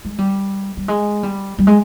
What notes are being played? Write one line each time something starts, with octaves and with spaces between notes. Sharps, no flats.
G#3
G3
G3
G#3
G3
G3
G#3